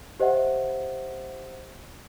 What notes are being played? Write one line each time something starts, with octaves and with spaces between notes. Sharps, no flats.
G4 C5 D#5 E5 F#5